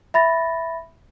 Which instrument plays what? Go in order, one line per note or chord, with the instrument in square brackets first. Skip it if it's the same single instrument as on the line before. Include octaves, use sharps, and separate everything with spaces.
[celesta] E5 B5 A6 A#6